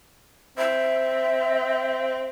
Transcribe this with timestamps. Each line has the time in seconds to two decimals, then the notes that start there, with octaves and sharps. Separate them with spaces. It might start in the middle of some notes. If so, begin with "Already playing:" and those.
0.58 C4 E5